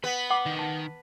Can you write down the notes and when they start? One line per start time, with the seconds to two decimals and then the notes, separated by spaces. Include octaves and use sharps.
0.04 B3 B5
0.30 F#5 D6
0.46 D#3
0.59 A5